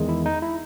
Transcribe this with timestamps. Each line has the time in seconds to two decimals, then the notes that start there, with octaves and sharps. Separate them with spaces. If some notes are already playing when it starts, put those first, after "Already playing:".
Already playing: E2 D#3 G#3
0.09 E4
0.26 D#4
0.42 E4